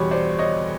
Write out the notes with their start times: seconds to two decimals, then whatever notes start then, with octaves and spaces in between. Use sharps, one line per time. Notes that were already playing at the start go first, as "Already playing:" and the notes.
Already playing: E2 B2 G3 B4 C#5
0.11 C5 D5
0.39 C#5 D#5